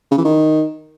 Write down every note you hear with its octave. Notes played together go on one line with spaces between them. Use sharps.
C#3
E3
D#3